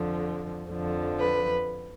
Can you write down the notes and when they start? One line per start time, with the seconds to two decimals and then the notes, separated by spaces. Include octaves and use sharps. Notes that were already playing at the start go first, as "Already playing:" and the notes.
Already playing: F2 D3 F3
0.70 F2 D3 F3
1.20 B4